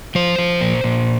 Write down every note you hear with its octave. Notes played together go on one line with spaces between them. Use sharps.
F3 C5
F3
A#2
A#2